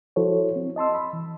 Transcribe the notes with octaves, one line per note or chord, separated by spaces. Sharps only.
F3 E4 F#4 A4 C5 C#5
C4
D#5 A5 C6 E6
B5
E3